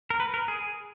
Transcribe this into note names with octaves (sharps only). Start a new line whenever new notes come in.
A#4
B4
A#4
G#4